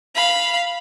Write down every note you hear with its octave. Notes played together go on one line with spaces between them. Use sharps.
F5 B5